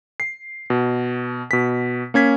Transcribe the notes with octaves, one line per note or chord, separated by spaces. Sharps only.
C7
B2
B2 B6
A#3 C#4 G#6 B6